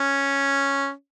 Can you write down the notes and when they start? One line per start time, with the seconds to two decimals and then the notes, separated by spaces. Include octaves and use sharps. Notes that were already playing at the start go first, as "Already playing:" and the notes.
Already playing: C#4